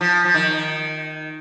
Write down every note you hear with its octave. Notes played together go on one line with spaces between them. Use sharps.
F3
F3
D#3